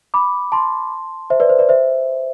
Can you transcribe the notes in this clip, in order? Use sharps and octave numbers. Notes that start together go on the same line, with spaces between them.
B5 D6
A5 C6
C5 E5
B4 D5
C5
B4 D5
C5 E5